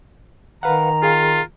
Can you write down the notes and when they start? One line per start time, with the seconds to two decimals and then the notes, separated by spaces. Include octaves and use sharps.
0.63 D#3 B4 F5 F#5 A#5
1.03 F4 G#4 F5